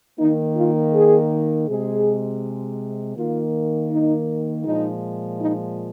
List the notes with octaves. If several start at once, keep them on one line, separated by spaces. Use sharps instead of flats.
D#3 A#3 D#4
F4
G#4
C3 G#3 G#4
D#3 A#3 F4
D#4
A#2 F3 G#3 D#4
D#4